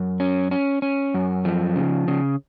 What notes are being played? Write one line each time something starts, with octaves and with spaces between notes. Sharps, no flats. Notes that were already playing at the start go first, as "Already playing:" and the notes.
Already playing: F#2
C#4
C#4
C#4
F#2
F3
C#3
C#3